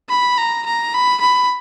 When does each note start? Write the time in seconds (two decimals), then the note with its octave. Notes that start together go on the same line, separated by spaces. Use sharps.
0.09 B5
0.37 A#5
0.66 A#5
0.94 B5
1.21 B5